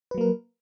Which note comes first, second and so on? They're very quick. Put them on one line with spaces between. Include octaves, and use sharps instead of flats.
B4 F#3 A#3 A#4